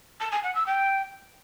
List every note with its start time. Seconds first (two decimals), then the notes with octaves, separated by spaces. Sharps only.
0.20 A5
0.31 G#5
0.43 F#5
0.54 E6
0.66 G5